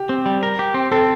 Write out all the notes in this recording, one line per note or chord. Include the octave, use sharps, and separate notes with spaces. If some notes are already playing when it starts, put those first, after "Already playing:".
Already playing: G4
C4
G3
A#4
G4
C4
C4 A4